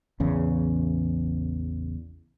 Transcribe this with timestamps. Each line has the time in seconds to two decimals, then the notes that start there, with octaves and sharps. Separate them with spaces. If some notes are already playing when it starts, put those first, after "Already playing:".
0.20 A1 E2 C#3